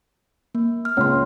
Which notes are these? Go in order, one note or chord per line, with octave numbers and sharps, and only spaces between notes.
A#3
F6
C#2 C#5 C6